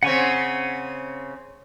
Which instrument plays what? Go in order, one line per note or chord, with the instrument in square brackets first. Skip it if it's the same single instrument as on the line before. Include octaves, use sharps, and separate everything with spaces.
[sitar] C#3 C4 [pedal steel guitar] F#5 G#5 C#6